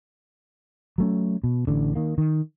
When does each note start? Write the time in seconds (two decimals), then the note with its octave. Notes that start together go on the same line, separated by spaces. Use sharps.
0.98 F#3 A3 C#4
1.44 B2
1.67 A1 D3
1.95 D#3 A#3
2.18 D#3